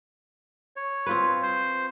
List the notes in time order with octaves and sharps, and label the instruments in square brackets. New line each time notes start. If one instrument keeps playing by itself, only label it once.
[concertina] C#5
[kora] C4 F4 B4
[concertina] C5